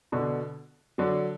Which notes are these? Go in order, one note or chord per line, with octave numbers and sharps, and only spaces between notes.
B2 D3
D3 F#3